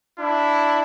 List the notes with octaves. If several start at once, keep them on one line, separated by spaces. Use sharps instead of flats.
D4 E4